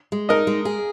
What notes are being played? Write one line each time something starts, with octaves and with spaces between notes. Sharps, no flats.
G#3
D#4 A#4 D#5
G#3
G#4